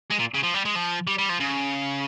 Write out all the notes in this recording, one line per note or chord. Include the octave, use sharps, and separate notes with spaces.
G#3
A#2
C#3
F3
G3
G#3
F3
G3
G3
F3
C#3